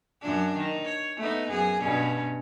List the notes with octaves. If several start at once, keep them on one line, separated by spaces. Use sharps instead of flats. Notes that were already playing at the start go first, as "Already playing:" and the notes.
F#2 D4
D#3
C#5
A3 B3 D#4
F#2 G#4
G2 B2 C#4